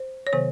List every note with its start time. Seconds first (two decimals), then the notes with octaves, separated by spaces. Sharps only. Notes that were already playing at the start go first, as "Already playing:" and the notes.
Already playing: C5
0.27 C#5
0.33 C3 D#3 F#3 B3 C5